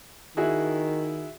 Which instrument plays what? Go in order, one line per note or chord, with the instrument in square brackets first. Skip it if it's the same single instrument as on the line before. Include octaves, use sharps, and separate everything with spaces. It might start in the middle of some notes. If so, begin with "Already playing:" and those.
[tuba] D#3 [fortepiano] E4 F#4 G#4